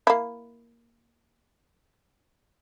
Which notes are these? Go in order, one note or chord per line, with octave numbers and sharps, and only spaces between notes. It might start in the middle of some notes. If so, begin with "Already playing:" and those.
A#3 E4